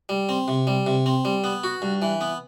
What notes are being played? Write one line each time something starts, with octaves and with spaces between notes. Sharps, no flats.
G3
C4
C3
G3
C3
C4
G3
B3
F#4
G2
E3
B3